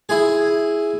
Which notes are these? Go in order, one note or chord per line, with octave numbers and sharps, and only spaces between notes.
E4 G#4